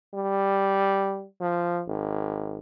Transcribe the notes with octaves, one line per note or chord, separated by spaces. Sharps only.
G3
F3
G#1